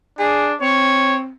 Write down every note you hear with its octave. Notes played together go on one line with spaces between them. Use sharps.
D4 G#4
C4 C#5